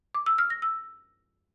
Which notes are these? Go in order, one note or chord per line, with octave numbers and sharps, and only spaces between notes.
D6
E6
F6
A#6
E6